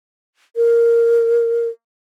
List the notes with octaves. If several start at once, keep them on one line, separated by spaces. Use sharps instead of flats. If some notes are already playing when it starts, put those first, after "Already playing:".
A#4